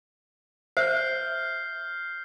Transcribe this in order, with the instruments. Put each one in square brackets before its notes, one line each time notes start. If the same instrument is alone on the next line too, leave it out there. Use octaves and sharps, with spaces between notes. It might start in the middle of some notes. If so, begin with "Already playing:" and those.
[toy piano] C5 E5 [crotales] F6 G6 C7